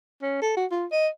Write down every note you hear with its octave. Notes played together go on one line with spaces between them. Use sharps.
C#4
A4
F#4
F4
D#5